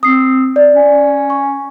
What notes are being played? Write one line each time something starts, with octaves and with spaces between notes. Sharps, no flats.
C4 D#6 C7
D5
C#4
C#6